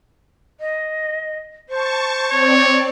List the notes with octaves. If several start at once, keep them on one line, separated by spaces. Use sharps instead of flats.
D#5
C5 A5 C#6
C4 C#5 D5